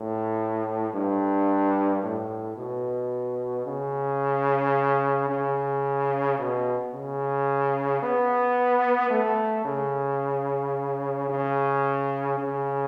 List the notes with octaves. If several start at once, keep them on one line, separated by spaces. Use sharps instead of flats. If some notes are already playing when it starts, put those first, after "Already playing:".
Already playing: A2
G2
A2
B2
C#3
C#3
B2
C#3
B3
A3
C#3
C#3
C#3